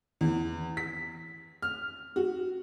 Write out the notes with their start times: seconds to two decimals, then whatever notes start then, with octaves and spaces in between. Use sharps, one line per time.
0.21 E2
0.77 B6
1.62 F6
2.16 F#4